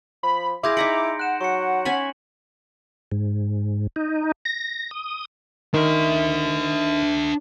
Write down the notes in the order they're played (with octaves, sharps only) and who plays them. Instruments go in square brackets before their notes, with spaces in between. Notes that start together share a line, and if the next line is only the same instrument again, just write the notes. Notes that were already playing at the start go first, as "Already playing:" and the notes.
[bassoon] F3 [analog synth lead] B5
[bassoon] E4 [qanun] G#4 F5 [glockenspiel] C6 G6 A#6 [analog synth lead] D6
[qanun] D#4 A#5 B5 [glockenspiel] C#7 D7
[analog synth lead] F#5 [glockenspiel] F#6 E7
[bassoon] F#3 [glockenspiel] C#6 C#7
[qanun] C#4 G#5 B5 [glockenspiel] F#7
[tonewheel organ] G#2
D#4
A#6
D#6
[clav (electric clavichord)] D#3 [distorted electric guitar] D4 E5